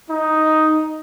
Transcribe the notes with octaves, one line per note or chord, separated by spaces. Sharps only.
D#4